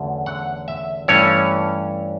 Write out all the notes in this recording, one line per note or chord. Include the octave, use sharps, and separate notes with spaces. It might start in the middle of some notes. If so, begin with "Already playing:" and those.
Already playing: E2 D3 F#3 A3 C#4
F#5
E5
G2 E3 A3 C#4 C#5